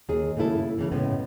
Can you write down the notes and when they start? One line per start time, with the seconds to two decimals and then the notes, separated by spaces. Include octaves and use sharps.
0.09 D#2 G#4
0.37 C#3 A3 A#3 E4 A4
0.78 C#3 E3
0.91 A2 C#3 G#3 B3